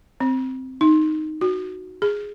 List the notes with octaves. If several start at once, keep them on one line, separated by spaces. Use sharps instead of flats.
C4
D#4
F#4
G#4